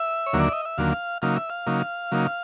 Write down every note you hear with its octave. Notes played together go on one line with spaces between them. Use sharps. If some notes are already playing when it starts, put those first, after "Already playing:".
Already playing: E5
C#5
D#2 D3 F#3 A#3
D5
D#5
E5
D#2 D3 F#3 A#3 F5
C#3 F#3 A#3 D#4 F5
E5
F5
C#3 F#3 A#3 D#4
C#3 F#3 A#3 D#4